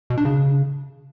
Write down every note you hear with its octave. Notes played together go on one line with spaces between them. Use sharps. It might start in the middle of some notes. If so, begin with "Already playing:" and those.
B2
D4
C#3